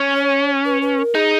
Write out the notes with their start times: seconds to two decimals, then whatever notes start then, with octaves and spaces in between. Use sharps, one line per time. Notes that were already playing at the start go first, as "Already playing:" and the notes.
Already playing: C#4
0.15 C#5
0.65 B4
0.82 B4
0.99 A#4
1.15 D#4 G#4